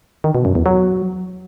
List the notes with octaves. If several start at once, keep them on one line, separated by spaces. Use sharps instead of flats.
D#3
B2
F#2
E2
F#3